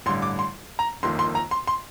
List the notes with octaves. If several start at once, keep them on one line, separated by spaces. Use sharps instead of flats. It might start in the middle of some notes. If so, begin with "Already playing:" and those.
A1 G2 D3 C6
D6
C6
A#5
G1 F2 D#3 A#3 C6
C6
A#5
C6
C6